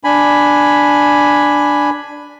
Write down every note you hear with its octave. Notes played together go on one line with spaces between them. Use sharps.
D4 G#5 B5